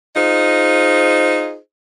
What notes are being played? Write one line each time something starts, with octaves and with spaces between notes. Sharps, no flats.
D#4 F4 G#4 C5 D#5